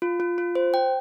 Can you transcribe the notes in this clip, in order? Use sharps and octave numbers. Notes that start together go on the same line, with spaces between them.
F4
F4
F4
C5
G5